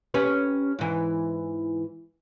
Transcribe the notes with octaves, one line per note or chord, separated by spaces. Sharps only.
C#4 G4 B4
G#2 E3